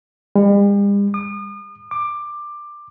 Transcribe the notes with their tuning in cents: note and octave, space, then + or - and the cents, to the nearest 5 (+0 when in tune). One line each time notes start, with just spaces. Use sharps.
G3 +45
D#6 -40
D6 +15